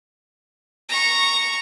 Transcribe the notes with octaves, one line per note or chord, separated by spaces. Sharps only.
A#5 C#6